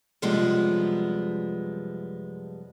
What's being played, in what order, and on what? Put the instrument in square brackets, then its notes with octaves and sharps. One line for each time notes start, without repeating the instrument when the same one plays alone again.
[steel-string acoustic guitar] F#2 C3 F3 G3 G#3 B3